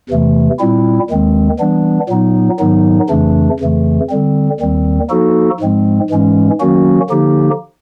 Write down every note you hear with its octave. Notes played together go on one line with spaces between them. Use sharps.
E2 C3 E3 A3
A#2 G3 C4 E4
D#2 D#3 G#3 C4
E3 G3 B3 D4
A#2 F#3 B3 D#4
G#2 D#3 F#3 B3 D#4
F2 C#3 E3 A3 D4
F2 C#3 E3 A3
D3 G3 C4
D#2 D#3 G3 C4
F3 A#3 D#4 F#4 A4
G#2 F3 G#3 C4
G#2 E3 G#3 C#4
D#3 F#3 A#3 C#4 F#4
D3 F3 A#3 D#4 G4